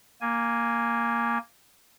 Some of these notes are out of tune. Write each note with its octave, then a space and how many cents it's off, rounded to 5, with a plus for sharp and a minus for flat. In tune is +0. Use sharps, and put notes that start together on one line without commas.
A#3 +0 G#5 +0